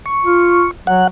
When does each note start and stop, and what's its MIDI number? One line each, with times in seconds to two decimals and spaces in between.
0.06 0.71 85
0.25 0.65 65
0.87 1.05 54
0.87 1.07 78